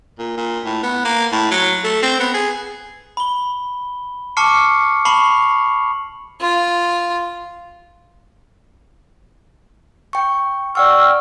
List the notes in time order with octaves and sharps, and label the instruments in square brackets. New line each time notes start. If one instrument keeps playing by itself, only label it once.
[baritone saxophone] A#2
A#2
A2
B3
A#3
A2
F#3
A3
C4
B3
G#4
[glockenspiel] B5 G7
A5 C#6 D6 F6 C7 C#7
A5 B5 C#6 C7 F7 F#7
[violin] F4
[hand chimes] G5 C#6
[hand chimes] D5 F#5 C#6 [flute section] G5 E6 F6